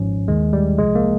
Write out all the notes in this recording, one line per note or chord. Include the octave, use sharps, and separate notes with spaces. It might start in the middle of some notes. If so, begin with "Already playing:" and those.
Already playing: G#1 G#2 F3 C#4
D#2 D#3 G#3
G3
C2 C3 F3 G#3
A#3